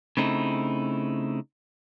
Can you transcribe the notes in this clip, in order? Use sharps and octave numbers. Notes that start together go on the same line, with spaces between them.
C#3 A3 C4 D#4 E4